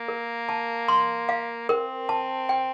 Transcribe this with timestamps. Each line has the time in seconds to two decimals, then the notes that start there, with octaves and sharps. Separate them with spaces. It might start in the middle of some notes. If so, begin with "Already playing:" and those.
Already playing: A#3
0.08 A#4
0.49 A5
0.88 C6
1.29 F5
1.69 C4 A#4
2.09 A5
2.49 G5